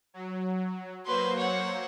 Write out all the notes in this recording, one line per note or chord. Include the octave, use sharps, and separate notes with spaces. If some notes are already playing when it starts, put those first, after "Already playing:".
F#3
F#3 A#3 B4 C5 C6
C#5 F#5